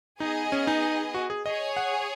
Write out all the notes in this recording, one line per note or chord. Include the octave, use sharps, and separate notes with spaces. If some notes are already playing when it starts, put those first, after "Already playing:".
B3 D#4 G#4 D#5 G#5
C#4
D#4
F#4
G#4
G#4 C#5 D#5 G#5
F#5